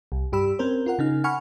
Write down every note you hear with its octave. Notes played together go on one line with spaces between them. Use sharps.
C2
G2 G4 B5 E6
C4 C#4 A#4 C5
F4 A#4 F#5
C#3 D#4 F6
F#5 G#5 B5 C#6 F6